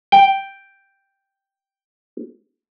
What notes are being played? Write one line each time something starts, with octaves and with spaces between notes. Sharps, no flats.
G5